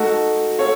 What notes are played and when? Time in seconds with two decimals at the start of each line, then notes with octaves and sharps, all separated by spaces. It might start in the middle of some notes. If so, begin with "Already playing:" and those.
Already playing: A3 D#4 F#4 A4
0.59 A4 C#5